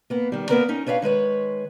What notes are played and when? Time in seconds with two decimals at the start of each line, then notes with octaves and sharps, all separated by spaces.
0.10 A#3 B3
0.32 D#3 G3
0.49 A#3 B3 A#4 B4 A#5
0.69 C#4 D#4
0.86 D4 B4 C#5 E5 F5
1.02 D#3 G#3 B4 C#5